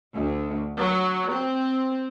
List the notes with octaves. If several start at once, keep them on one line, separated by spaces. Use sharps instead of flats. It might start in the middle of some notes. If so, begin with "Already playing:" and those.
D2
F#3
C4